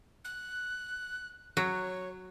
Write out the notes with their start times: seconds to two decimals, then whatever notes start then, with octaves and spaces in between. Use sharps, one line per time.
0.24 F#6
1.57 F#3 C#5